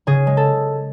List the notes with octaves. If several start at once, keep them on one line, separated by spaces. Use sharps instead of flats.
C#3 G#4
G#3
A4